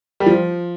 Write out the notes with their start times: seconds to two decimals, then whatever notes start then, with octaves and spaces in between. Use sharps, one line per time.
0.20 G3
0.26 F3